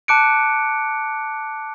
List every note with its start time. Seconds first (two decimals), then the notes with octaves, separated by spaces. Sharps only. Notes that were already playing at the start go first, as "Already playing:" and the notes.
0.08 A5 D6 F#6 C#7 D7